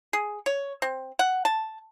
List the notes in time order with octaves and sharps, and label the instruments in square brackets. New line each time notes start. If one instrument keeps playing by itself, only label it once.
[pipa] G#4
C#5
C4
F#5
A5